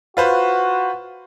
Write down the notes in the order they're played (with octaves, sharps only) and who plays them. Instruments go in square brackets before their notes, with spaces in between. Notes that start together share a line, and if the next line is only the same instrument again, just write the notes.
[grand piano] F4 B4 C5 [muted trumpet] F#4